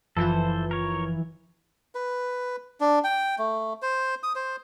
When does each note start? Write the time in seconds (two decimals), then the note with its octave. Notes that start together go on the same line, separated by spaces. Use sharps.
0.17 F#1 E3 F3 F4 A4 C5
0.71 A#4 C#5
1.95 B4
2.80 D4
3.04 G5
3.38 A3
3.82 C5
4.23 D#6
4.35 C5